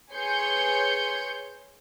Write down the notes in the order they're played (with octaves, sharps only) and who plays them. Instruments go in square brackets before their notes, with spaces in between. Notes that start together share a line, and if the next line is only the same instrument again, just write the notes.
[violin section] G#4 B4 C#5 C6 G6 C#7